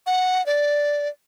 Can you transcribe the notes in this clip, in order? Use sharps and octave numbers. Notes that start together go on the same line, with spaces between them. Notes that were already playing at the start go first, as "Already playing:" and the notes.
F#5
D5